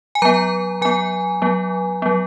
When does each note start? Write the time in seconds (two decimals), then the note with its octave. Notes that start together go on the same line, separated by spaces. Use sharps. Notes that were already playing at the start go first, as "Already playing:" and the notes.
0.15 G#5
0.22 F#3 B3 A#5
0.81 F#3 B3 G#5
1.42 F#3 B3
2.02 F#3 B3